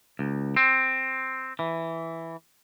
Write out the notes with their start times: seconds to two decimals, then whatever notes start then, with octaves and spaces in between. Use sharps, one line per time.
0.19 C#2
0.57 C4
1.59 E3